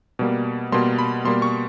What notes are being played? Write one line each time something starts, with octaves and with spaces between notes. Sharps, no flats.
B2 G3 A#3
B2 G3 A#3 C6
B5
B2 G3 A#3 C6
C#6